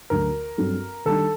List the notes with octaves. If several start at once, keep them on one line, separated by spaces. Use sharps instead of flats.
D2 D3 F#3 A3 A#4
G2 F#3 C4 F#4 A4
D#3 G3 D4 A4